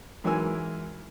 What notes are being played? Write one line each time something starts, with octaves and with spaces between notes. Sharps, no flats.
G#2 E3 F#3 A#4 G#5 E6